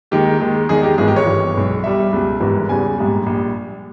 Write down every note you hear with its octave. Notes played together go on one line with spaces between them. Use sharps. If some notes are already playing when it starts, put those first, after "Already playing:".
D#2 D#3 G#3 G4
D#2 D#3 G#3
E2 D#3 G#3 G#4
G4
G#1 G#2 E3 G#3 G#4
G4
C#5
G1 G2 E3 G3
B1 B2 G#3
G1 G2 G3 E5
C#2 B2 G3
G#1 G#2 E3 G3
E2 C#3 G3 G#5
A#1 G#2 G3
A#1 G3